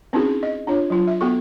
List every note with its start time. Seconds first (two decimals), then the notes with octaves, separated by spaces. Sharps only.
0.13 C4 C#4 D#4 E4 F#4 G#4
0.43 D#5
0.67 D4 F4 C#5
0.90 F#3 F4
1.07 E5
1.21 B3 F#4 A4 C#6